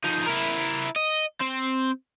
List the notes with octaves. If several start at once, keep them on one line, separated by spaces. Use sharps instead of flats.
F3 D#4
E4 A#4
D#5
C4